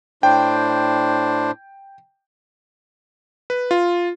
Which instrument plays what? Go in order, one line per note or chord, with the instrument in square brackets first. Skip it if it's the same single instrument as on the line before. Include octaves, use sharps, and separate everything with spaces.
[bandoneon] A2 D4 C5 [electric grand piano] G5
[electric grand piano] B4
F4